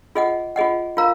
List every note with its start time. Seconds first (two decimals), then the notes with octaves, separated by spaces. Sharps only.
0.15 F4 G#4 D#5 F#5
0.56 F4 G#4 D#5 F#5
0.97 F4 A#4 F5 A#5